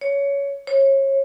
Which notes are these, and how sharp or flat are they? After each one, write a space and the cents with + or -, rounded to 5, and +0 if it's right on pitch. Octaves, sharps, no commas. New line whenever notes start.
C#5 +15
C#5 -30